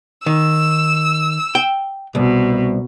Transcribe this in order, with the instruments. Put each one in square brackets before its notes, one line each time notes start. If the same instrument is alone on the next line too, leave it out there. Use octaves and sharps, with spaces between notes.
[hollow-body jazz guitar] D#3 [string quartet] E6
[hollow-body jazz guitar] G5
[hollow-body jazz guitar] C2 [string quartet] B2